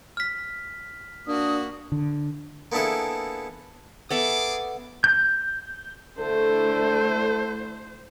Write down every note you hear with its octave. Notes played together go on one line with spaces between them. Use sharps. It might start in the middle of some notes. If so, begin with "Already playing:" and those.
F6 B6
A#3 D4 F#4 D#6
D3
A#3 B3 D4 E4 G#4 A4
B3 G#4 A4 E5 D6
G6
D3 A3 E4 A4 C5